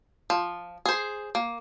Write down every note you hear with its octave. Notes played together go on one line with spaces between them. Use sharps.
F3
G#4 C5
A#3